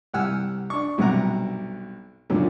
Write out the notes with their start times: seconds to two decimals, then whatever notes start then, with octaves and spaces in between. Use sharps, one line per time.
0.13 C2 G4 F#5 G#5 E6 F6
0.70 D4 C#6
0.98 B1 G2 C3 F#3 F#5 A#5
2.30 C#2 F#2 A#2 D3 D#3 C#4